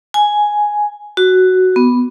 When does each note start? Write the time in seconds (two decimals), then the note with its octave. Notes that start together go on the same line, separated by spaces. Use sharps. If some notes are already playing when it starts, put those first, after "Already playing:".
0.14 G#5
1.17 F#4
1.76 B3